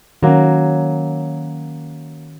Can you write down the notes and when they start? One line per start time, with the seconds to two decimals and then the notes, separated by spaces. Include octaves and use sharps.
0.23 D#3 F#3 A#3 C#4